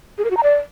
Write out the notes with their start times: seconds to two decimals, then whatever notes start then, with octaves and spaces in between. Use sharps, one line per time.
0.18 G#4
0.24 A#4
0.31 F#4
0.37 A#5
0.43 D5